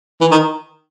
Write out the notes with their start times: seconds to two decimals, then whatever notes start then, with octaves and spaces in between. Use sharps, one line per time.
0.21 E3
0.31 D#3